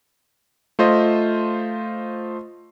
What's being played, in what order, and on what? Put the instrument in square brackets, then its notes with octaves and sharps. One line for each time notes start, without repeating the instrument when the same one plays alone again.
[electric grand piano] A3 F4 C5 D#5